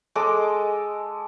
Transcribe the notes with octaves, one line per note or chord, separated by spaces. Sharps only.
G#3 A4 D#5 D6